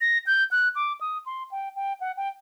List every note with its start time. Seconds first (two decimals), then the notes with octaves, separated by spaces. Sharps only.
0.01 A#6
0.27 G6
0.51 F#6
0.76 D6
1.01 D#6
1.26 C6
1.52 G5
1.76 G5
2.01 F#5
2.17 G5